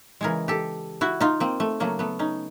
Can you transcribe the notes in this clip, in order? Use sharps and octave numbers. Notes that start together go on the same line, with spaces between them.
C#3 E3 G#3 G#4 A#4
G4 A4
E4 F#4
D#4 F4
A#3 C4
A3
C#3 F#3 A3 A#3
A3 B3
C#4 D#4